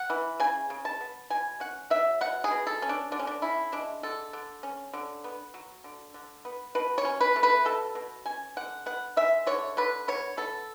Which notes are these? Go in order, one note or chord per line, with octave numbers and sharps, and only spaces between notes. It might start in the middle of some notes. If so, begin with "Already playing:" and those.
Already playing: F#5
E3
C#3 G#5
C#3
A5
B3
B2 G#5
C#4 F#5
F#3 E5
B2 F#5
G#4
B2
A4
C#4
D4
D3 D4
C#4
D4
C#4 E4
G#3 D4
D3 A4
D3
C#4
D3
B3
F#3
D3
D3
B3
B2 B4
C#5
C#4
B4
A3
B4
B2 A4
B2
C#4 G#5
D3 F#5
B3 F#5
G#3 E5
D3 C#5
D3 B4
B3 C#5
B3 A4